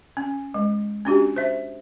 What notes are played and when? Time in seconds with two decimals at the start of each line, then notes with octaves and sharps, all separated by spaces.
0.17 C#4
0.54 G#3
1.05 C#4 D4 F#4 G4
1.36 C5 E5